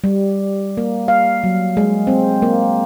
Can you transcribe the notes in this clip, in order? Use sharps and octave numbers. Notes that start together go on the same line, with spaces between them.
G3
A#3
F5
F#3
G#3
C4
A#3